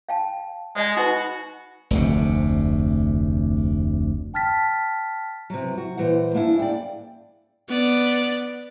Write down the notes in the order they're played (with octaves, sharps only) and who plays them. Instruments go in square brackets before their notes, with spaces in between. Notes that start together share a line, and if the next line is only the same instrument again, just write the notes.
[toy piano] F5 G5 A5
[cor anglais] G#3 [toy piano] D5 D#5 G#5
[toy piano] D#4 B4 B5 [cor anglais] F#4
[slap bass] F1 D2 C3
[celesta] G5 A5 F6 A6 B6
[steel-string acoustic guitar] C3 F#3
F#4
A#2 E3 C5 F#5
A#3 C#4 D4 E4
D5 G5
[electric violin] B3 D5